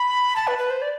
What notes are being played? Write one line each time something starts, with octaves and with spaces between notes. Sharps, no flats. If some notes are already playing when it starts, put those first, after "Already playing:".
Already playing: B5
A5
B4
B4
C5
D5